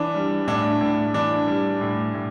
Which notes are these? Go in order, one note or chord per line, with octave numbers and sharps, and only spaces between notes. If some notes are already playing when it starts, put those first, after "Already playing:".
Already playing: E3 D4
G3
A2 D4
A2
E3 D4
G3
A2
A2